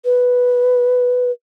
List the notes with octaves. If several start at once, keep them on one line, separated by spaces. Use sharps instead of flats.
B4